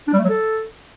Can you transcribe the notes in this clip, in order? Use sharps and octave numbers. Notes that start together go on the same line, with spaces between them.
D4
G3
A3
F#3
A4